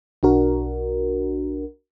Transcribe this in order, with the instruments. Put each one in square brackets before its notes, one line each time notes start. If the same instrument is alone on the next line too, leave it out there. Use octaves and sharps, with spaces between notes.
[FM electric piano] B1 D4 F#4 A#4